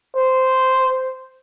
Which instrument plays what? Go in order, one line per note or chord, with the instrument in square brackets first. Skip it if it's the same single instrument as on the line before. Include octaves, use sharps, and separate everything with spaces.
[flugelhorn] C5